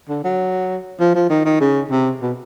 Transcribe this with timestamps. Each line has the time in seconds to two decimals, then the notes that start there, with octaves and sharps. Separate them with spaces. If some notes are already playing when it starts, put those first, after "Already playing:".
0.09 D3
0.24 F#3
1.00 F3
1.15 F3
1.30 D#3
1.45 D#3
1.61 C#3
1.91 C3
2.22 B2